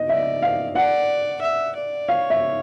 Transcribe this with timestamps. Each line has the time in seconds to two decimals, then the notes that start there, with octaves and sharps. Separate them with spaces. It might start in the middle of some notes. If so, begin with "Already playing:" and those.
Already playing: D#5
0.09 D5 E5
0.42 F5
0.75 D5 F#5
1.41 E5
1.75 D5
2.08 C#5 F5
2.30 E5